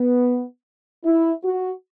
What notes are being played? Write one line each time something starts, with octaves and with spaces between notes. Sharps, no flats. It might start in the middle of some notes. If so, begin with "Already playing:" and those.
Already playing: B3
E4
F#4